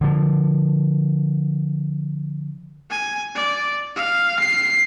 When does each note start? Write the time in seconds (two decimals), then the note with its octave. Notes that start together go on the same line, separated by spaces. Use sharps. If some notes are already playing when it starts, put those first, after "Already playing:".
0.01 D3 F3
2.91 G#5
3.35 D5
3.96 F5
4.40 C7